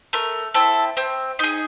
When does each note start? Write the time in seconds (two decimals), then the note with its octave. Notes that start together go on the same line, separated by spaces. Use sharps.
0.13 A3 A#4
0.54 C4 E4 A4
0.97 C4
1.39 D#4 G#4